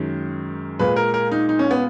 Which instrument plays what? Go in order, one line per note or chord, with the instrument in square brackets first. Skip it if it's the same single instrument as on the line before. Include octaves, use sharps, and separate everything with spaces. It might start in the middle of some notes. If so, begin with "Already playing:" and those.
Already playing: [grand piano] F#2 D#3 G#3
A#2 G#3 B4
A#4
A#4
D#4
D#4
C#4
B3